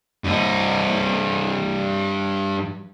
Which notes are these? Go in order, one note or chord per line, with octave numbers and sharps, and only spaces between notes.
G2 D#5